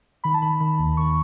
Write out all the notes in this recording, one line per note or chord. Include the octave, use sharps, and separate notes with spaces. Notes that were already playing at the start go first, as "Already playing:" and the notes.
D#3 B5
A5
D#3 B5
D#3 B5
D#2
D#3 C#6